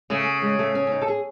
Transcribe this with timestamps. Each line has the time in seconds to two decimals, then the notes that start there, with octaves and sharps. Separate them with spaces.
0.10 C#3 A3
0.42 G#3
0.59 A3
0.75 C#4
0.87 C#4
0.92 D#4
1.01 A4
1.08 G#4